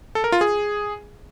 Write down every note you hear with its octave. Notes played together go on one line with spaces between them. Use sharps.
A4
A#4
F4
G#4